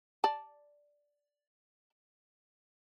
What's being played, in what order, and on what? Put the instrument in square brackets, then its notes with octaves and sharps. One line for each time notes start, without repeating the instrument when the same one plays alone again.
[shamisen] D5 A5